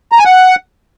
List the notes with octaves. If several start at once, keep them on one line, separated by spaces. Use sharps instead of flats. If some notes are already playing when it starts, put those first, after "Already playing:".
A#5
G#5
F#5